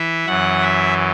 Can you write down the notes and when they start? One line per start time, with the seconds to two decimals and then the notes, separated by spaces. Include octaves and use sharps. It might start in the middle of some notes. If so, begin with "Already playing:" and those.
Already playing: E3 E5
0.26 F#2 E3 F#5
0.62 E5